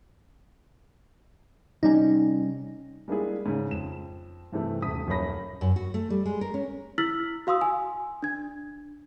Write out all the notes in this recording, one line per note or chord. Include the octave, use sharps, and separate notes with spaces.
C3 G3 C#4 D#4
G3 G#3 A#3 D4 E4 G#4
G#2 C#3
F2 E7
G2 C3 E3 A3 C4
D#1 D2 D#6 B6
D#1 F#2 A#3 C#5 B5 A#6
F#2
F#4
A3
G3
G#3
A#4
C#4
E4 E6 F6 A6 B6 F#7
F#4 F5 C6 D#6 E6
G#5
D4 G#6